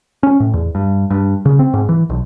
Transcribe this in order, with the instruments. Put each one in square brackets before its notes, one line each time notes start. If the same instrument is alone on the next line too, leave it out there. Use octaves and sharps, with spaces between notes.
[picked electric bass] C#4
A2
E2
G2
G2
C#3
C4
G#2
E3
B1